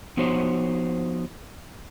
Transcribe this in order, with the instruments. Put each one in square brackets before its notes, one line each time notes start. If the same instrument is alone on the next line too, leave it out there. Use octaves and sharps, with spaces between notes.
[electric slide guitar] F3 B3 D#4 F#4 C5 C#5